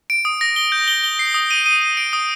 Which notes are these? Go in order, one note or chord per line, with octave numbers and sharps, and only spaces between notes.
D7
D#6
A#6
G7
G6
G7
G7
C7
D#6
D#7
D#7
D#7
D7
D#6